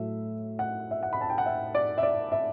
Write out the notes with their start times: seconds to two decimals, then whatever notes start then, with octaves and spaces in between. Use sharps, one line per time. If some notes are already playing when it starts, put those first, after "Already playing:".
Already playing: A2 F#3 A3 E5
0.59 F#5
0.91 E5
1.03 F#5
1.13 B5
1.21 A5
1.30 G5
1.38 F#5
1.46 E5
1.75 D5
1.98 E5
2.03 D5
2.32 E5